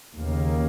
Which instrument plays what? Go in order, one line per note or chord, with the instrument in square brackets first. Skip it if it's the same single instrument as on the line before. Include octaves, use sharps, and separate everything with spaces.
[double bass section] D#2 C#3 A#3